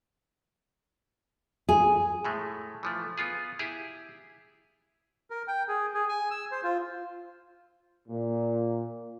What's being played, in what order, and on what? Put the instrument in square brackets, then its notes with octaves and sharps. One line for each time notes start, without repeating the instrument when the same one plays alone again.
[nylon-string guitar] G#4
[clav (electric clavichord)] A2 G#3 A3
E3 F3 A3
B3 F4 G#4
E4 G4 G#4
[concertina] A#4
G5
G#4
G#4
G#5
E6
C5
F4
[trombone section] A#2